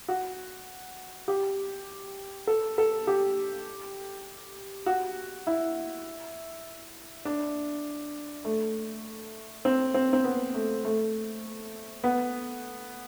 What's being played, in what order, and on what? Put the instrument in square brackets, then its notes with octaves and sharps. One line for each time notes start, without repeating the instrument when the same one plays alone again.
[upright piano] F#4
G4
A4
A4
G4
F#4
E4
D4
A3
C4
C4
C4
B3
A3
A3
B3